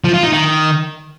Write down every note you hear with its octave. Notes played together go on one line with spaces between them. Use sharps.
F3
F4
D#4
D#3